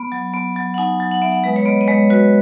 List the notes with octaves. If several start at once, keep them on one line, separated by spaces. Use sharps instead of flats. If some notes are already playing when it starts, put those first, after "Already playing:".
Already playing: B3
F#3
B3
F#3
F#5
D#4 G#5
F#3
F#5
B3 E5
F#5
G#3 B4
C#5
B3 D#5
D#5
G#3 C#5
F#4 B4